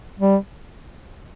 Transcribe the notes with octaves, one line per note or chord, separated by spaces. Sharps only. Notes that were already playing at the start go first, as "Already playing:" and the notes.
G3